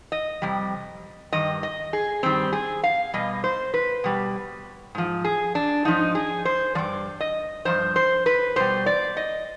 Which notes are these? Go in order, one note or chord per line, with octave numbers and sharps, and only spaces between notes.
D#5
F2 C3 G3
G2 D#3 D#5
D#5
G#4
G2 D#3 G3 C4
G#4
F5
B2 G3 D#5
C5
B4
B2 G3
G#2 F3
G#4
D4
G#2 F3 D#4
G#4
C5
G2 F3 D5
D#5
G2 F3 C5
C5
B4
B2 G3 C5
D5
D#5